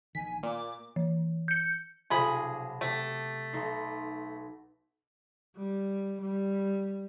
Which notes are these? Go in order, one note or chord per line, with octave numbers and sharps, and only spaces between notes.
A#1 D#3 G#5 B6
A#2 A#3 D6
E3
G6 C#7
B1 C3 F3 G#4 B5
C3 A3 G#6
B1 D#4 C6
G3
G3